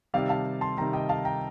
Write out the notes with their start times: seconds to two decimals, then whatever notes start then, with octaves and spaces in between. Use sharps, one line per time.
0.14 C3 D#3 G3 D5 F5
0.29 F5 A5
0.61 A5 C6
0.77 C3 D#3 G3 G5 A#5
0.93 D#5 G5
1.09 F5 A5
1.25 G5 A#5